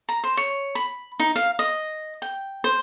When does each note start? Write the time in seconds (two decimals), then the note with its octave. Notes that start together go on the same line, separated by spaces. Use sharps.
0.09 A#5
0.24 C5
0.37 C#5
0.75 B5
1.20 D#4
1.36 F5
1.59 D#5
2.22 G5
2.64 C5